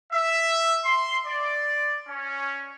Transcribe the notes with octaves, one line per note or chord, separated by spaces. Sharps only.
E5
C6
D5
C#4